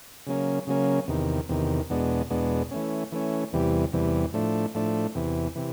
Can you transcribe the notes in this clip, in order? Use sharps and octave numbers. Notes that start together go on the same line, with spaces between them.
C#3 F#3 A#3 C#4
C#3 F#3 A#3 C#4
E2 C3 D#3
E2 C3 D#3
E2 B2 G#3 B3 D4
E2 B2 G#3 B3 D4
E3 A3 C#4
E3 A3 C#4
E2 C3 E3 G3
E2 C3 E3 G3
A2 F3 A3 D4
A2 F3 A3 D4
E2 C3 E3
C3 E3